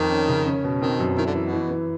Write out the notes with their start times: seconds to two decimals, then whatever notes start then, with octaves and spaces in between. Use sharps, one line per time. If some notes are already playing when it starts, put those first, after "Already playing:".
Already playing: F2 D#3
0.10 C#4
0.28 C#3
0.46 C#4
0.64 B2
0.82 D#3 C4
1.00 F#2
1.17 D#3 E4
1.26 D3
1.35 E3
1.44 B2
1.53 E3
1.71 E3